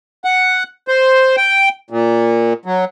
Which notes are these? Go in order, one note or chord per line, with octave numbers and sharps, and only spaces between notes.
F#5
C5
G5
A#2
F#3